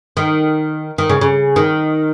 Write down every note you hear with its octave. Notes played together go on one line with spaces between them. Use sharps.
D#3
D#3
C#3
C#3
D#3